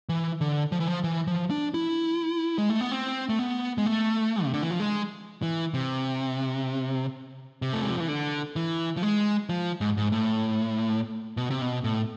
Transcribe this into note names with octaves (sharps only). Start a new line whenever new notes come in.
E3
D3
F3
E3
F3
E3
F3
D4
E4
G#3
A3
B3
C4
A3
B3
G#3
A3
C3
D3
E3
F3
G#3
E3
C3
C3
A3
G#3
F3
E3
D3
E3
F3
G#3
F3
G#2
G#2
A2
B2
C3
B2
A2